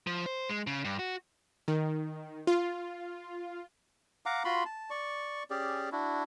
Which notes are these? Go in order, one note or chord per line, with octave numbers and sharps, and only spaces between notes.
F3
C5
G#3
C#3
G2
F#4
D#3
F4
F5 F#5 A#5 D6
F4 F#4 B5 C6
A5
D5 C#6
C#4 G4 G#4 D5
D4 E4 F#4